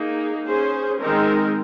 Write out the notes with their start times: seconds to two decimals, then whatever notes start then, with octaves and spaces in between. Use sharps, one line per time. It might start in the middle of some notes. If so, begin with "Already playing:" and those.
Already playing: A#3 D#4 G#4
0.46 C#4 G#4 C5
1.01 D#3 G#3 C4 D#4 A#4